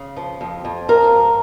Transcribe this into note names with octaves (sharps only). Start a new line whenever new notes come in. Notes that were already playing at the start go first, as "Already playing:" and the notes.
Already playing: C#3
F3
F2
F2
F3 A#4
G#2